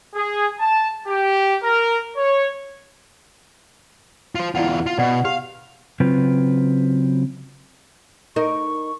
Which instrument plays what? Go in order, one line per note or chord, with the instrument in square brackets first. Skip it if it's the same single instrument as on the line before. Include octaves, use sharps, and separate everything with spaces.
[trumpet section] G#4
A5
G4
A#4
C#5
[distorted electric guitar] F4 C5
[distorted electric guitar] E2 F4 [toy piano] E4 D5 F#5
[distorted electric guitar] F4
[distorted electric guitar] B2 [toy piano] D5 F#5
[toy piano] G4 [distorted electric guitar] F5
[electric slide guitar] C#3 F#3 C4 F4 B4
[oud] D#4 A#4 [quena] C#6